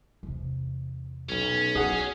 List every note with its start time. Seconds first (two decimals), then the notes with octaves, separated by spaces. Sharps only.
0.23 E2 C3
1.29 B1 C#4
1.75 E4 G#4 F#5